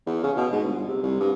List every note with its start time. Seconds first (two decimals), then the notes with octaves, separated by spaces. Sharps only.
0.07 E2
0.23 C#3
0.37 B2
0.52 G#2
0.64 G1
0.88 C3
1.03 C2
1.20 G2